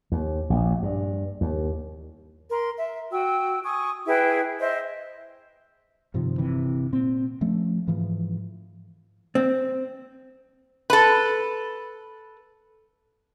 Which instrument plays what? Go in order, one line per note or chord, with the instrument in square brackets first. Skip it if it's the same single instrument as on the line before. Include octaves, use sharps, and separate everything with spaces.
[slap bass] D#2
A#1
G2
D#2
[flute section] A#4 C6
E5
F#4 G5 E6
G#5 C#6 D#6
E4 G#4 B4 G5
C5 D#5 E5
[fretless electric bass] G2 C3 D#3 F3
G1 C3 E3
A#2 C4
F3 A3 C#4
G#2 E3 F3
[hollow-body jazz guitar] C4
[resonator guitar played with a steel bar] A4 B4